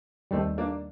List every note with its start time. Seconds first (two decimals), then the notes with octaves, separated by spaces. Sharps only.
0.31 D#2 D#3 G3 A3 C4
0.58 A#3 D4